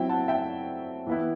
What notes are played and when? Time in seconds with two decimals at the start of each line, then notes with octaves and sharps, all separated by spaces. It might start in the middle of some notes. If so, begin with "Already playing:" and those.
Already playing: F#3 C4 E4 E5 G5
0.09 F#5 A5
0.28 E5 G5
1.07 E3 B3 E4